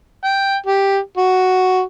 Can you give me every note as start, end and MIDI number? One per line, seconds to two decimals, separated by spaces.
0.25 0.55 79
0.66 0.98 67
1.17 1.81 66